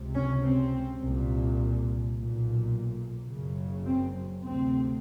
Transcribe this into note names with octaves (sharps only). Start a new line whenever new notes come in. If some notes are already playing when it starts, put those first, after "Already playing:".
Already playing: C#2 C3
C#4
C4
C2 A#2
B1 A#2
F#1 F#2 C#3
C4
D2 C3 C4